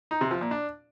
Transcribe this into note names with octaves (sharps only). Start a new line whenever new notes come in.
D#4
C3
F3
A#2
D4